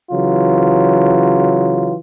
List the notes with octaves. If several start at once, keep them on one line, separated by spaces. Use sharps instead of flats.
C#3 E3 F#3 F4